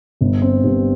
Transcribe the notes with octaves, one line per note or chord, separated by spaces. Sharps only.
G1
C4
G2